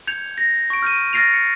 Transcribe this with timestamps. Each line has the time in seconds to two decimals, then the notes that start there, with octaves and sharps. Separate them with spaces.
0.07 G6 G#6 C#7 F7
0.38 A#6
0.70 C#6 D7
0.82 F6 G6 D7 D#7
1.13 F6 A6 A#6 C7 D7 F7
1.33 C#7